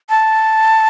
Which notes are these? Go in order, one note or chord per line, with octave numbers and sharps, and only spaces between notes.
A5